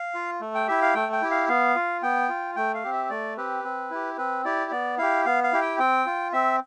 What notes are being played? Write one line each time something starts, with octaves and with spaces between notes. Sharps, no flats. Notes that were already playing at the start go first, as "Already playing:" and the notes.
Already playing: F5
F4
A3
G5
E4 G4 E5
F5
A3 G5
G5
E4 G4
F5
B3 F5
F4
B3 G5
F4
A3 G5
F5
C4 G4
E5
A3 D5
C4 G4 B4
C4
E4 G4
C4 B4
E4 G4 D5
B3 D5
E4 G4 F5
B3 F5
F5
E4 G4
G5
C4 G5
F4
C4 E5